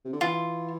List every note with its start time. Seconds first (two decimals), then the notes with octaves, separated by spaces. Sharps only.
0.05 C3
0.13 D3
0.21 E3 F4